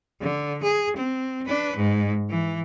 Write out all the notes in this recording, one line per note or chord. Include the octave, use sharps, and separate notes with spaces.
D3
G#4
C4
D4 B4
G#2
E3